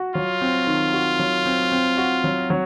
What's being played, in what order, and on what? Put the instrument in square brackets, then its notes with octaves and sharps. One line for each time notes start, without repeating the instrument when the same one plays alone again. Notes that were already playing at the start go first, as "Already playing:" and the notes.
Already playing: [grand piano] F#4
[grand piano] F#3 [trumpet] F4
[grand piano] C4
D#3
F#4
F#3
C4
C4
F#4
F#3
F#3